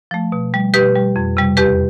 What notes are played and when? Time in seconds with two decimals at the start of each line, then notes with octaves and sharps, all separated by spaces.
0.11 F3 A3
0.32 B2
0.54 G3
0.74 B2 G4 B4
0.96 G3
1.16 F2
1.37 C3 G3
1.57 E2 G4 B4